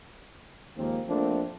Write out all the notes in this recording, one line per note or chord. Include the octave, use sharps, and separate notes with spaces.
D#2 F3 G#3 A#3 C4
F3 A3 A#3 C4 D4